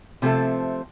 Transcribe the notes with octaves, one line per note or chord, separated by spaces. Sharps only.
C3 F3 A3 C4 A4